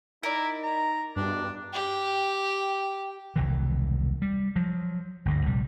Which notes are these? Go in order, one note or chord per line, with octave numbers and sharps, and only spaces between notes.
D#4 E4 A#4 D5
A#5
E2 G2 B2 D4
G4 G5
E1 C2 D#3 E3
G3
F3 F#3
G1 D2 G2
A#1 C3 G3